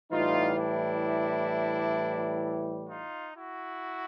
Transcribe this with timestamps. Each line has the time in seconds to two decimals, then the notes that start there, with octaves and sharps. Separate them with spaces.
0.12 A2 E3 G3 D#4 F4
0.58 D4 E4
2.89 D#4 F4
3.35 E4 F#4